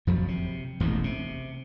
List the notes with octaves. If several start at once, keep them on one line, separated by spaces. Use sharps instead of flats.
F#1 F2 F3 F#3
C3
E1 A1 D#2 G#2
C3